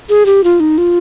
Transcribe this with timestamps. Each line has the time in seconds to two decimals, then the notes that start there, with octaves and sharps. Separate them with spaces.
0.09 G#4
0.26 G4
0.44 F4
0.60 D#4
0.78 F4